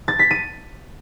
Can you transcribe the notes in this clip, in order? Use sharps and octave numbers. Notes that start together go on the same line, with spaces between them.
A6
B6
D#7